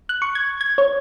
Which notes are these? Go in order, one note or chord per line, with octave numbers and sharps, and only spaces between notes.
F#6
C#6
G#6
G#6
C#5